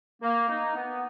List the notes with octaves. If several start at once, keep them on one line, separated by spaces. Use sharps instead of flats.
A#3
D#4
B3